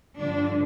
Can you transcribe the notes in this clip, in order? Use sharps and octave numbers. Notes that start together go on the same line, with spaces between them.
G2 D3 F3 D4